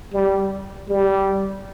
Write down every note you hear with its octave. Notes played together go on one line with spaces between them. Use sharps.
G3
G3